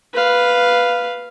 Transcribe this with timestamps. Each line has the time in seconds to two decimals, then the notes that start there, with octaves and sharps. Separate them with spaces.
0.14 B4 F5